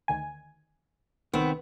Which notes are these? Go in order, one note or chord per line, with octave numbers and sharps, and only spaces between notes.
D2 D#3 G#5
C2 D#3 B3 C4